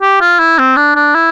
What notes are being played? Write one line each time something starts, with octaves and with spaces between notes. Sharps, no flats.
G4
F4
E4
C4
D4
D4
E4